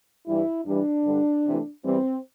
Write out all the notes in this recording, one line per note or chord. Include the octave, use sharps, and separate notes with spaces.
G2 E3 G3 E4
G2 E3 G3 D4
G2 D3 G3
C3 E3 A3
E2 E3 G3 C4